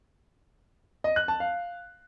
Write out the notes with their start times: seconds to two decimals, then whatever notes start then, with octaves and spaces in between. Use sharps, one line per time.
1.04 D#5
1.16 F#6
1.28 A5
1.40 F5